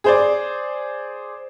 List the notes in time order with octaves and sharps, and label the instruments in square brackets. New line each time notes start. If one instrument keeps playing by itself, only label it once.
[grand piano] G#4 C5 D5